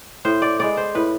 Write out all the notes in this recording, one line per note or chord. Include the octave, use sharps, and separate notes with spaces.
A2 C5
D5
G#3 B3 D5
C5
A2 B4